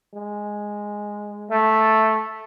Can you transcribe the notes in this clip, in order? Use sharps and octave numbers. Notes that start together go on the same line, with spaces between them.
G#3
A3